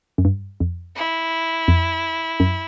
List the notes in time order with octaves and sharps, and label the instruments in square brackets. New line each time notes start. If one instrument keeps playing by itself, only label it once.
[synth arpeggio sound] F#2
G2
F2
[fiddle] E4
[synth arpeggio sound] F2
F#2